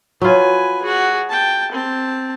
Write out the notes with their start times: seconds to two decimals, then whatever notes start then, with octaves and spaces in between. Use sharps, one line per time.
0.22 F#3 F4 B4 G#5
0.82 F#4 G#4
1.30 G5 A5
1.72 C4 A5